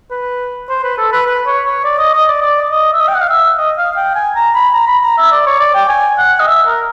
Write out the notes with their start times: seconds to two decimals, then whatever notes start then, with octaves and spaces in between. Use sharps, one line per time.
0.11 B4
0.69 C5
0.83 B4
0.98 A4
1.12 B4
1.26 B4
1.46 C#5
1.66 C#5
1.84 D5
1.98 D#5
2.13 D#5
2.28 D5
2.42 D5
2.71 D#5
2.93 E5
3.00 D#5
3.08 G5
3.15 F#5
3.21 F5
3.29 E5
3.57 D#5
3.78 F5
3.96 G5
4.15 G#5
4.36 A#5
4.55 B5
4.74 A#5
4.88 B5
5.03 A#5
5.18 E5
5.32 D5
5.46 C#5
5.60 D5
5.75 G5
5.89 G#5
6.18 F#5
6.40 D#5
6.47 E5
6.67 A#4